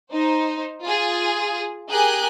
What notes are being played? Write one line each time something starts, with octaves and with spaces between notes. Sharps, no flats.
D#4 C5
F4 G#4
G4 G#4 A#4 G#5 F#6 G6